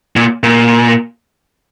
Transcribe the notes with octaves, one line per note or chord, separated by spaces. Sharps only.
A#2
A#2